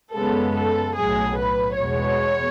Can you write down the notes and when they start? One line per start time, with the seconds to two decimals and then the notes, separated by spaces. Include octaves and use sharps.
0.14 F#2 C#3 G#3 B3 A4
0.55 A4
0.96 B1 A2 F#3 G#4
1.38 B4
1.78 E2 B2 G#3 B3 C#5